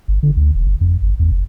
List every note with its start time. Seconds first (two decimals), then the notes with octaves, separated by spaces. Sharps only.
0.08 G1
0.23 D3
0.36 D2
0.55 E1
0.67 F#1
0.81 F2
1.02 G1
1.19 E2
1.32 F#1